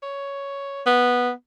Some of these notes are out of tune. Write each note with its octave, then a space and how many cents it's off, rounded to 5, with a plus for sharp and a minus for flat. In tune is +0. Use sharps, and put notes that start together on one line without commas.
C#5 +5
B3 -5